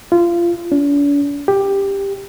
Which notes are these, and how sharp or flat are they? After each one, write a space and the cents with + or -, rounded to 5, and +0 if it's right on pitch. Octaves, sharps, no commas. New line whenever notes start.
F4 -25
D4 -45
G4 +10